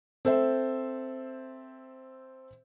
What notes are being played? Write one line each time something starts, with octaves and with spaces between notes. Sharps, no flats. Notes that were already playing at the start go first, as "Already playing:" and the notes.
C4 A4 C5 E5